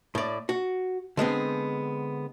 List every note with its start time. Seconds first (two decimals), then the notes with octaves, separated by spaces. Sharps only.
0.15 A2 D5
0.49 F#4
1.17 D3 G#3 B3 C4